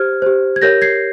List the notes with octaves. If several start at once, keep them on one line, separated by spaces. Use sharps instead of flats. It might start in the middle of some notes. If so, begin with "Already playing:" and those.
Already playing: G4 C5 F6 G#6
G4 C5
G#6
G4 A#4 C#5 G6 A#6
G#6 C7